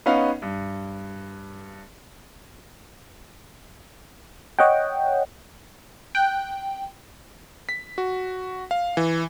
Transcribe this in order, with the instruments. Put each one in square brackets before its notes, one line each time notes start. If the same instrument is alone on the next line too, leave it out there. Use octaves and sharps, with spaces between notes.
[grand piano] B3 C#4 D#4 F5 F#5
G2
[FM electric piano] C#5 D#5 F#5 G5
[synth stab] G5 F#6
[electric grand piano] B6
F#4
F5
E3